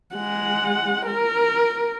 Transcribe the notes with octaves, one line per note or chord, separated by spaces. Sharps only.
G#3 F#5
A#4